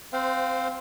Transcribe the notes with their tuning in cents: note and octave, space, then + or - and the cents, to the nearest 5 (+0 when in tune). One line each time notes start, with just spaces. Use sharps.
C4 +0 C5 -25 F5 +10